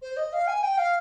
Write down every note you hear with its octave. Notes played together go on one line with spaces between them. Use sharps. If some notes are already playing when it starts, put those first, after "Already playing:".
C5
D#5
F5
G#5
G5
F5